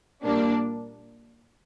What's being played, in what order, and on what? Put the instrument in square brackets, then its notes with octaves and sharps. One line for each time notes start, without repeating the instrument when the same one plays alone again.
[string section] A#2 G3 A#3 D4